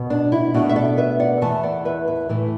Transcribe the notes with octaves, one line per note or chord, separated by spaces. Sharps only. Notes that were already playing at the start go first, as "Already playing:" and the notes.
Already playing: B2 B3
D4
E4
B2 A3 D4 F#4
E5
A4 D5
B4 E5
D5 F#5
E2 E3 A3 E5 A5
D5 F#5
B4 E5
B4 E5
A2 E3 A3 E4 A4